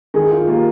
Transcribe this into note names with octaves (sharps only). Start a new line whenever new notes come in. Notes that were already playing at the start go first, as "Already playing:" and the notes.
D#3 G#4
F4
A#3 F4 G4